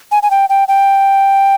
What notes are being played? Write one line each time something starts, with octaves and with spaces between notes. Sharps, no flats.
G#5
G#5
G5
G5
G5